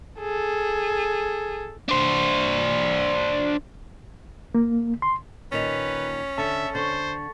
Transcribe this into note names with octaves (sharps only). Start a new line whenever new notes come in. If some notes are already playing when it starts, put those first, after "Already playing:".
G#4 A4
D4 C5
A#3
C6
A#2 D#3 C#4 B4 A6 B6 F7
D3 E5 A5 A6 C#7
D3 C5 C#6 A6